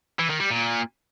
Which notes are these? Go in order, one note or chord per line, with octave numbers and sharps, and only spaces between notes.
E3
D#3
G3
A#2